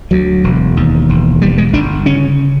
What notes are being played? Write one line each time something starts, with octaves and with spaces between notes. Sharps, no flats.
D2 F#3
E1
D#2
E1
G2 G3
G#3
G1 D4
C#3 C#4